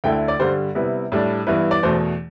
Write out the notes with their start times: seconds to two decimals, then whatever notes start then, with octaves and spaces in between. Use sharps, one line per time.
0.04 D2 D3 A3 E4 G5
0.28 D5
0.39 G2 D3 G3 C5
0.75 C3 G3 B3 E4
1.12 A2 G3 D4
1.47 G2 E3 B3 E4 B4
1.71 D5
1.83 E2 B2 A3 C5